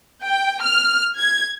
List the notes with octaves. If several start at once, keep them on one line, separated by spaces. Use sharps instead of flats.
G5
F6
G#6